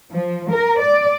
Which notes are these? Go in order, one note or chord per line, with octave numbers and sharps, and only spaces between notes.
F3
A#4
D5